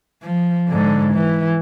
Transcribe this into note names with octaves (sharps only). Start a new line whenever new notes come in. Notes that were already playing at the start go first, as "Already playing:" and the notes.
F3
G#2 D3
E3